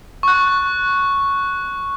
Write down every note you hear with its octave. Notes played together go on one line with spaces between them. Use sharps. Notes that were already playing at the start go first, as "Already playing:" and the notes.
C#6 F#6